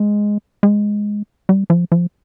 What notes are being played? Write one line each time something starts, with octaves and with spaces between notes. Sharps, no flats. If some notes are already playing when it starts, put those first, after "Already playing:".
Already playing: G#3
G#3
G3
F3
F3